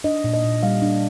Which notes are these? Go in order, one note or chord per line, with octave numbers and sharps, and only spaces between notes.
D4 D#5
A#2
D#5
A#2
G3 F5
D4